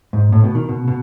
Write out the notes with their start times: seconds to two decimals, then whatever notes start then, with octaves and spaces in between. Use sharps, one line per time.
0.13 G#2
0.32 A2
0.44 B2
0.55 D#3
0.69 B2
0.88 B2